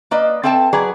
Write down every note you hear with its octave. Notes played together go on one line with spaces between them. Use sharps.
A#3 B4 D5 D#5
C4 A4 E5 G5 A5
F#3 G#4 B4 D5